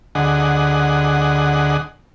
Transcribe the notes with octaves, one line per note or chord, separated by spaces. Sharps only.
D2 D3 G#4 D#5 F#5